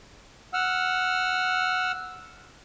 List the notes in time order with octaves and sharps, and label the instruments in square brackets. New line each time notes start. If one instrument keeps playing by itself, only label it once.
[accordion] F#5 E6 F6